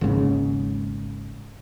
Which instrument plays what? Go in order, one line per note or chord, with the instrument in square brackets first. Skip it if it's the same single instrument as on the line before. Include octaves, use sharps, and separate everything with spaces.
[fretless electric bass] G#1 D#2 G#2 C#3